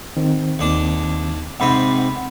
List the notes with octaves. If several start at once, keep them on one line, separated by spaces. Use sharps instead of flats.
D#3 C4
D#2 D4
G#2 C3 C4 F#5 B5